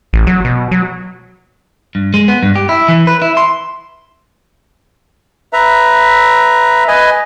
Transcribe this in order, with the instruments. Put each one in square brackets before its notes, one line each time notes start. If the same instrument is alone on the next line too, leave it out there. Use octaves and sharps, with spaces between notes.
[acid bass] A1
F#3
B2
F#3
[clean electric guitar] G2
G#3
B3
G2
G4
E4
E3
B4
E4
C6
[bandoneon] B4 E5 A#5
B4 D#5 G#5